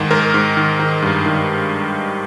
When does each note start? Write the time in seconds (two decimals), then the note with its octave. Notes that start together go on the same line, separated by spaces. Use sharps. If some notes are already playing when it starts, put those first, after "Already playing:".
Already playing: G#2 D#3
0.11 G#2 A#4
0.34 G#2
0.57 D#3
0.80 D#3
1.02 G2
1.26 D#3